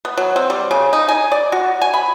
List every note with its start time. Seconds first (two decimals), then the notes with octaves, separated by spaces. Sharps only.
0.05 B3
0.17 F#3
0.36 C4
0.50 G3
0.71 C#3
0.93 D#4
1.08 G#5
1.32 D5
1.52 F#4
1.82 G#5
1.94 B5